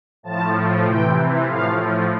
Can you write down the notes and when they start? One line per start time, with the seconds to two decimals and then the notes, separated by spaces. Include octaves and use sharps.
0.23 A2 F3 A5
0.84 C3 E3 G5
1.45 A2 F3 F5